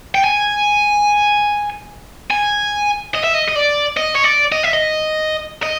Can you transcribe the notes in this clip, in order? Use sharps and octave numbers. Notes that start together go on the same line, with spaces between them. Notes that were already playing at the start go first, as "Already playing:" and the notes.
G5
G#5
G#5
D#5
E5
D#5
D#5
D5
D#5
C#5
D5
D#5
E5
D#5
D#5